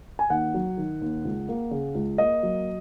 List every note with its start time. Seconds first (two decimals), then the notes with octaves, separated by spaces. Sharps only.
0.19 G#5
0.30 D#2 F#5
0.54 F#3
0.77 D#3
1.01 D#2
1.25 C#2
1.49 A#3
1.71 C#3
1.95 C#2
2.18 A#3 D#5
2.43 F#3